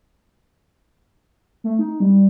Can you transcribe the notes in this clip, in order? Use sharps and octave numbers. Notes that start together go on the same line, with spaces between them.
A3
D#4
G3